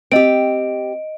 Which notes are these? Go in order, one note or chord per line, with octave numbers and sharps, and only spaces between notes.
C4 G4 D#5 D7